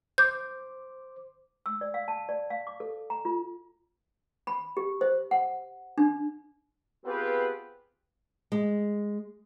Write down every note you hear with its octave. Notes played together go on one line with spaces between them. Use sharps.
C5 D6 G6
E6
D5
F5
A5
D5
F5
D6
A4
A#5
F4
B5
G4
C5
F#5
D4
B3 C4 F4 G4 G#4 B4
G#3